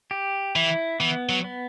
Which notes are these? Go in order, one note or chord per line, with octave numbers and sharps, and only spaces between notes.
G4
E3 E4
E3 B3
F#3
B3